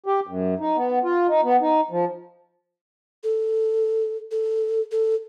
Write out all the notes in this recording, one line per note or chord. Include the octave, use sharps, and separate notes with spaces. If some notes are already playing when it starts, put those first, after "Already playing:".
G4
F#2
D#4
B3
F4
D#4
B3
D#4
F3
A4
A4
A4